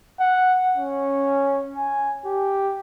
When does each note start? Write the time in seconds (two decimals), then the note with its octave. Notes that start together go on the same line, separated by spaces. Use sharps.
0.20 F#5
0.76 C#4
1.77 G#5
2.26 G4